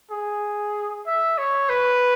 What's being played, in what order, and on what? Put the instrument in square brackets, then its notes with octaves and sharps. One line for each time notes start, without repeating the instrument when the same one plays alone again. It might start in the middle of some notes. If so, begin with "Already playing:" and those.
[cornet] G#4
E5
C#5
B4